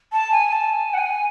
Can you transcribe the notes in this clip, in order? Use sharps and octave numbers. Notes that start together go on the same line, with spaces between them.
A5
G#5
A5
G#5
F#5
G#5